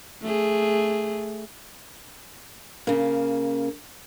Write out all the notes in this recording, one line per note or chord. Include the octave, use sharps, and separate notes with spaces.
A3 G#4
C#3 A#3